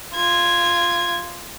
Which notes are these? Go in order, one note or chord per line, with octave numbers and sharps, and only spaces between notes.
F4 G#6